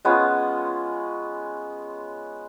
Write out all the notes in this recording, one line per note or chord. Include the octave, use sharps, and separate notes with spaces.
G#3 B3 C#4 F4